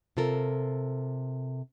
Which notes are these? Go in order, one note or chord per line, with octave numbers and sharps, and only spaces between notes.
C3 F4 A4 A#4